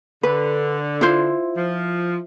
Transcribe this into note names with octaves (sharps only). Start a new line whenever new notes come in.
D3 B4
E4 F4 C5
F3